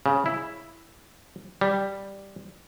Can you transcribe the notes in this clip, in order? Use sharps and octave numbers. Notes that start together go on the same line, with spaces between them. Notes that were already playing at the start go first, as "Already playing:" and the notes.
C#3
E4
G3